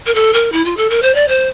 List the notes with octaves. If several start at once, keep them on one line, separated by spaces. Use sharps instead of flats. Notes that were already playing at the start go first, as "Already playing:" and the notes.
A#4
A4
A#4
E4
F4
A4
A#4
C5
D5
C5